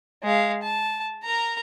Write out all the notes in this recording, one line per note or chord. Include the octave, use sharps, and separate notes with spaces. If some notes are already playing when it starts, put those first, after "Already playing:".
G#3 F5
A5
A#4 A#5